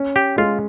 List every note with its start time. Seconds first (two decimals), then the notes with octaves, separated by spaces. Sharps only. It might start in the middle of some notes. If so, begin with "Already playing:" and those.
Already playing: C#4
0.16 G4
0.38 G#3 F4